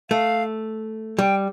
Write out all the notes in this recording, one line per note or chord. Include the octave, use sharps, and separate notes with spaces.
A3 F5
G3 G5